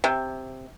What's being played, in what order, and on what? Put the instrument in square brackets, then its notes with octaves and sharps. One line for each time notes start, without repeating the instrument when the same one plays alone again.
[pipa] C3